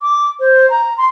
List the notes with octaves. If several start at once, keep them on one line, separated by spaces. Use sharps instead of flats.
D6
C5
A#5
C6